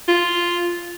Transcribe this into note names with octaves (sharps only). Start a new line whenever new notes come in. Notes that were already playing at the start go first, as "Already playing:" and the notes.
F4